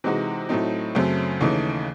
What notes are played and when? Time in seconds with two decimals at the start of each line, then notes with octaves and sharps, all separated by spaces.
0.04 C3 E3 G#3 D#4 F#4
0.49 A2 F#3 A3 C4 D#4
0.95 F#2 C#3 F#3 A3 C4
1.41 D#2 C#3 E3 A3 D#4